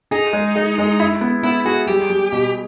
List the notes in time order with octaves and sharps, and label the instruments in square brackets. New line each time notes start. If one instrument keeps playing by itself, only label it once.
[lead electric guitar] D#4 [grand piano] G#4
[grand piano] G#3
G#3
G#3
E4
B3
[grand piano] B3 [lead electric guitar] E4
[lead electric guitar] F#4 [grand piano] G#4
[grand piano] G3 [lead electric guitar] G4
[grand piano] G3
B2